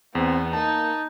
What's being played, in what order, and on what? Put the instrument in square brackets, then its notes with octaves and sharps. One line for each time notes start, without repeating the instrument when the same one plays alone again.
[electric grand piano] E2 [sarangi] B3 [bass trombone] C4
[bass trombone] A#3 [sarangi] D#4 [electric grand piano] A5